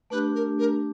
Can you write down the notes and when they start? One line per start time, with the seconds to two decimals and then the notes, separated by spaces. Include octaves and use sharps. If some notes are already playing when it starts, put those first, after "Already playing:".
0.10 A3 D4 G4 B4
0.34 A#4
0.58 A#4